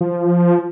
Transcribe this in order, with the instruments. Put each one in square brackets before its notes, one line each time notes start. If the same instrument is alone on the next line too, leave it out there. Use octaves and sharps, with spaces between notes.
[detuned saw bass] F3